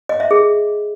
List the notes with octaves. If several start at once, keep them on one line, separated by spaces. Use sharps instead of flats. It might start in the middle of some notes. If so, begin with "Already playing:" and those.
D#5
E5
G#4